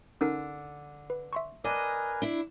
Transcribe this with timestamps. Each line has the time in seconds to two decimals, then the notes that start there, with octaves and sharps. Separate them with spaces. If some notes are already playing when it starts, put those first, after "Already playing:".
0.21 D3 C#4 D#4 A#4
1.10 B4
1.33 E5 C6 C#6
1.65 D4 A#4 B4 D#5 G#5
2.22 D4 E4